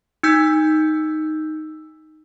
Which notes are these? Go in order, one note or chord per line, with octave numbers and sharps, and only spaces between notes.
D#4 E6 G6 B6